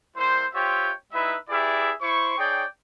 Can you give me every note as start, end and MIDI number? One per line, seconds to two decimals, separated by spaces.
0.17 0.45 55
0.17 0.45 58
0.17 0.45 64
0.17 0.45 72
0.54 0.91 65
0.54 0.91 67
0.54 0.91 72
0.54 0.91 73
0.54 0.91 76
0.54 0.91 79
1.13 1.36 55
1.13 1.36 63
1.13 1.36 64
1.13 1.36 71
1.13 1.36 76
1.50 1.92 64
1.50 1.92 67
1.50 1.92 68
1.50 1.92 71
1.50 1.92 74
1.50 1.92 76
2.02 2.37 64
2.02 2.37 72
2.02 2.37 85
2.38 2.64 63
2.38 2.64 68
2.38 2.64 73
2.38 2.64 74
2.38 2.64 79